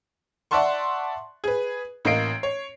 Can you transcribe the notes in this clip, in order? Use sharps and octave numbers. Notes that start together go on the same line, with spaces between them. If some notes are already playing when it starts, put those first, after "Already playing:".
D5 E5 F#5 A5 C6 C#6
G#4 B4
A1 A#3 D#5 C7 D7
C#5